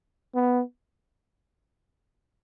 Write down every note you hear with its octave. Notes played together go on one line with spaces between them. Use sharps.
B3